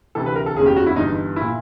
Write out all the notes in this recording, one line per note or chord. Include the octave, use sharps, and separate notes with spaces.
D2 C3 E3 A4
B4
A#4
A4
F#1 E2 C#3 G#4
G4
F#4
E4
G1 G2 E3 D#4
A#2 E4